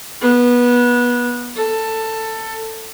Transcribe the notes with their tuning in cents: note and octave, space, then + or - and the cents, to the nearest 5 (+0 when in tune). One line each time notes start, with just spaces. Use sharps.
B3 -20
A4 +15